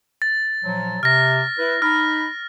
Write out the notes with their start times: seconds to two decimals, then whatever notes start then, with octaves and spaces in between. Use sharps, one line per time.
0.22 A6
0.64 A#2 F3 F#3
1.03 C3 F6 A#6
1.59 E4 B4
1.82 D#4 B5 F6